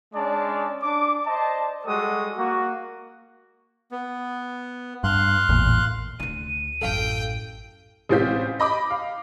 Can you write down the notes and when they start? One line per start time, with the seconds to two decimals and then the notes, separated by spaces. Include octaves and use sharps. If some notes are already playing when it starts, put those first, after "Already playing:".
0.14 G#3 C#4 D4 D5 A5
0.82 D4 D6
1.26 C5 D5 D#5 A5
1.86 G3 G#3 F#4 A4 D#6
2.37 A#3 F#4
3.92 B3
5.04 G2 F5 C6 F#6
5.49 A1 E2 A#2
6.20 D2 D4 D#7
6.82 A1 F#2 A4 F5 G5
8.09 A1 G#3 C4 F4 G6 B6
8.60 D#5 B5 D6
8.90 F5